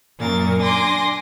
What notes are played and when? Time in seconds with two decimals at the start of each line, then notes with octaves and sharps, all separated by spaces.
0.19 F#2 A#2 A#4 A6
0.62 D4 G#5 C6 D6 A#6